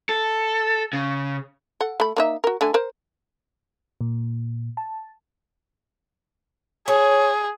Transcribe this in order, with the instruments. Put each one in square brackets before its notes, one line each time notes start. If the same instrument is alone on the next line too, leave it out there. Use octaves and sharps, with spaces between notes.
[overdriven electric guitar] A4
C#3
[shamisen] A4 F#5
A3 B5
A#3 D#4 E5
F#4 A#4
D3 A3 G#5
A#4 C5
[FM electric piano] A#2
A5
[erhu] G#4 [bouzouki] C#5